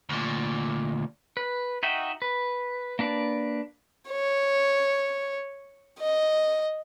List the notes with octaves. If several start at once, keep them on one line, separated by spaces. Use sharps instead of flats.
D2 A#2
B4
D#4 F#4 E5 G5
B4
A#3 D4 B4 D5
C#5
D#5